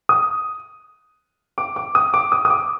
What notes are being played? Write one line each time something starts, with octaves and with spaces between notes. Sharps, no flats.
D#6
D6
D6
D#6
D6
D#6
D#6
D6